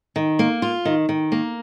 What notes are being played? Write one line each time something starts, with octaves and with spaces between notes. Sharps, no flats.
D#3
A#3
F4
D#3
D#3
A#3